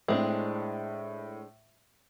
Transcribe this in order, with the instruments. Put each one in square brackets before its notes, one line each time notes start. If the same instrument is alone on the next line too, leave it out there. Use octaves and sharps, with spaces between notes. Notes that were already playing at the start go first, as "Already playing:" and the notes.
[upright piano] A2 [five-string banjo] G#3 C4 D4